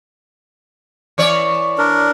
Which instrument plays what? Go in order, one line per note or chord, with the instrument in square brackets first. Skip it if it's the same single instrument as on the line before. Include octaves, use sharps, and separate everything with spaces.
[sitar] E3 C#5 D5
[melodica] D4 A#4